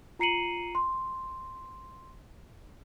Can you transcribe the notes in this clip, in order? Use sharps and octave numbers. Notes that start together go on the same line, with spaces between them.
F4 A#5 C7 C#7 D#7 F#7
C6